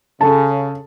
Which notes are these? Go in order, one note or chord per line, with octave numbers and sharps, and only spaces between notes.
C#3 A4 A5